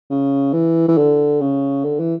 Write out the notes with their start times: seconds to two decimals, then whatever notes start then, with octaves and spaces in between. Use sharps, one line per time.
0.10 C#3
0.53 E3
0.88 E3
0.97 D3
1.41 C#3
1.84 D3
1.99 E3